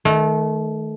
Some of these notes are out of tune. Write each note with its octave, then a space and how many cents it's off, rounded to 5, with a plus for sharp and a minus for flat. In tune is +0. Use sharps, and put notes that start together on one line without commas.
D#3 +0 A3 -25